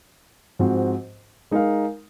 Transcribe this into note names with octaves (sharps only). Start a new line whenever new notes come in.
G#2 F3 C4 F#4
G#3 D#4 A#4 F5